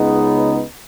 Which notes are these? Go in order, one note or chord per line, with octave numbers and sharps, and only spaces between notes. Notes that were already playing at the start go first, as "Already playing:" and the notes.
Already playing: C#2 C#3 G#3 B3 D#4